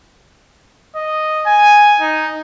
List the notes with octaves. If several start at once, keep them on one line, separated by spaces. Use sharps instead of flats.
D#5
G#5
D#4